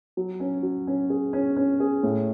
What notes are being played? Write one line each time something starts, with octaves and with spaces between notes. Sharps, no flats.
F#3
C#4
F#3
C#4
G#4
C#4
C#4
G#4
A2